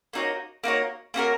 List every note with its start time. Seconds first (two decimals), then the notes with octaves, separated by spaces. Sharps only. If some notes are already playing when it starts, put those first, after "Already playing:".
0.13 A#3 D#4 F#4 C#5
0.63 A#3 D#4 F#4 C#5
1.14 A#3 C#4 F#4 A#4